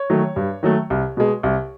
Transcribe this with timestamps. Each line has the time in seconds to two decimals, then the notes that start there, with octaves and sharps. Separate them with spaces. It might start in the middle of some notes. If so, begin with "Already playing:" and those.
Already playing: C#5
0.10 D#3 F#3 A3
0.36 G2
0.63 D#3 F#3 A3
0.90 C2
1.17 B2 G#3
1.43 C2